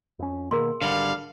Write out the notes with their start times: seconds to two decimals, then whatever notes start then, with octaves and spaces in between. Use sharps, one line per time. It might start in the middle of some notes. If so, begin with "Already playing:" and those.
0.19 F2 C#4
0.51 B2 D#3 A#3 G#4 A#4 C6
0.82 G#1 D3 G3 F5